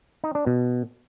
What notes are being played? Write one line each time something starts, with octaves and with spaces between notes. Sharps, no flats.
D#4
D4
B2